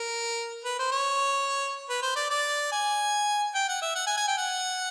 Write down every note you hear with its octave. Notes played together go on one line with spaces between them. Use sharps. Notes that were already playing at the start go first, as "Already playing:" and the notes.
Already playing: A#4
B4
C5
C#5
B4
C5
D5
D5
G#5
G5
F#5
E5
F#5
G#5
G#5
G5
F#5